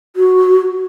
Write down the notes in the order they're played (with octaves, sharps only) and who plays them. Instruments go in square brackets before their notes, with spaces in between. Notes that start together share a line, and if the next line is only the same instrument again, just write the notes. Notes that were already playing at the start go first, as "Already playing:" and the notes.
[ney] F#4